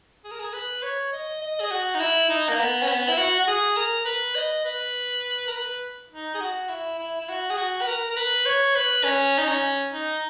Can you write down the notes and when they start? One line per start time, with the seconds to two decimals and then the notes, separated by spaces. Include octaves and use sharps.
0.24 G#4
0.31 A#4
0.40 G#4
0.53 B4
0.83 C#5
1.13 D#5
1.41 D#5
1.61 G#4
1.71 F#4
1.95 D#4
2.00 E4
2.30 D#4
2.49 A#3
2.59 B3
2.82 C#4
2.88 B3
3.08 E4
3.18 F#4
3.40 F#4
3.47 G#4
3.77 A#4
4.05 B4
4.35 D#5
4.65 B4
5.48 A#4
5.52 B4
6.12 D#4
6.35 G#4
6.41 F#4
6.69 E4
6.99 E4
7.20 E4
7.29 F#4
7.50 G#4
7.58 F#4
7.82 B4
7.87 A#4
8.11 A#4
8.17 B4
8.46 C#5
8.76 B4
9.04 C#4
9.38 D#4
9.48 C#4
9.93 D#4